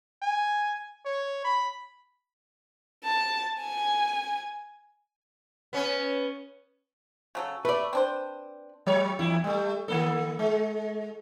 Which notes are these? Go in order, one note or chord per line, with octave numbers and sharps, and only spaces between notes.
G#5
C#5
B5
A5
G#5
B3 C#4
C#3 F#3 A4
A3 B4 D5
C4 D4 C5
F#3 C#5
E2 E4
G3 A3
D#3 A#3 A4
G#3